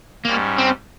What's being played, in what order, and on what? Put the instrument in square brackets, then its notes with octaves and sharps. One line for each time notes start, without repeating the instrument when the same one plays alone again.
[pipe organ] G#2 G3 C#4 [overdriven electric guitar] A#3
[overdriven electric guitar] C4